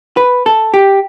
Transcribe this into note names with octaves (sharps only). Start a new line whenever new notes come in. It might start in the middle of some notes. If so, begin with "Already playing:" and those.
B4
A4
G4